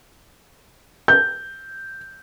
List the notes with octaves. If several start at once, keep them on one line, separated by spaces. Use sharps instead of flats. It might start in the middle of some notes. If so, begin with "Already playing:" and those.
G6